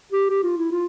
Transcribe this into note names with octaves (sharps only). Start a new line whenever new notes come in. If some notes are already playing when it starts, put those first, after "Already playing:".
G4
G4
F4
E4
F4